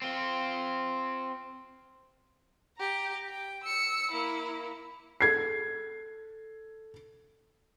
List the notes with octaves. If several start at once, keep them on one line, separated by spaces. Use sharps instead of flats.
C4 F4
G4 A#5
G5
E6 C#7
A#3 E4
A4 G#6 C7